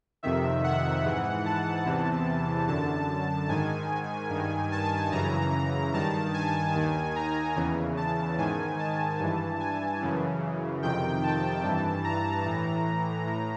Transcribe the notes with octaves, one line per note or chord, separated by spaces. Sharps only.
F2 C3 D#3 E5
F#5
G#2 E3
A5
E2 C3 E3
F#2 D3 A5
G#2 D#3 G#5
G2 D#3
A5
F#2 C#3 E3 A#5
G2 D#3 A5
G#5
D#2 D#3
A#5
E2 C#3 E3
A5
G#2 D#3 G#5
A5
G2 E3
G#5
F#2 C#3 E3
F2 C3 D#3 G5
A5
G2 E3
A#5
A2 E3
A2